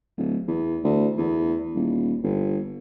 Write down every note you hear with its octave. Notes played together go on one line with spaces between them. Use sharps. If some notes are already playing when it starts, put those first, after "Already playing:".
D1
E2
D2
E2
D#1
G1